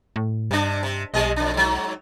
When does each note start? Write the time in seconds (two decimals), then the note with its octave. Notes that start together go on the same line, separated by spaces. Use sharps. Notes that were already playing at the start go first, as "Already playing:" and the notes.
0.16 A2
0.51 G2 C3 D4
0.83 C3
1.14 B1 C3 G3 D#5
1.36 F2 D4
1.54 G#2 F#3